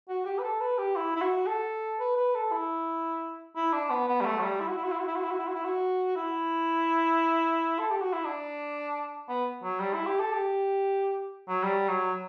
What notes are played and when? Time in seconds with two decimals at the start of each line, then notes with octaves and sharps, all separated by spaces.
0.08 F#4
0.25 G4
0.39 B4
0.43 A4
0.60 B4
0.78 G4
0.96 E4
1.16 E4
1.21 F#4
1.47 A4
2.00 B4
2.16 B4
2.34 A4
2.52 E4
3.56 E4
3.73 D4
3.90 B3
4.08 B3
4.21 G3
4.26 A3
4.39 F#3
4.42 G3
4.60 E4
4.68 F#4
4.76 E4
4.84 F#4
4.92 E4
4.99 F#4
5.07 E4
5.16 F#4
5.24 E4
5.31 F#4
5.39 E4
5.47 F#4
5.55 E4
5.64 F#4
6.16 E4
7.79 A4
7.91 G4
8.01 F#4
8.13 E4
8.25 D4
9.28 B3
9.63 F#3
9.80 G3
9.94 E4
10.06 G4
10.20 A4
10.33 G4
11.49 F#3
11.63 G3
11.89 F#3